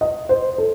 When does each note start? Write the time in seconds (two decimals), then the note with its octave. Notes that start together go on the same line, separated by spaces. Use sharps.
0.01 D#5
0.29 C5
0.58 A4